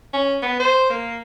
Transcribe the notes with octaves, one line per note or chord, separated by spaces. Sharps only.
C#4
B3
C5
A#3